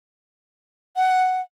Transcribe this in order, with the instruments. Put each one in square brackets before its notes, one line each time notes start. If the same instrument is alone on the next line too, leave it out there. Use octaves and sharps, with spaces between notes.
[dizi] F#5